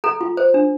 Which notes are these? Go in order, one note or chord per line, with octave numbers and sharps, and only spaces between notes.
A4 A#5
F4
C5
D4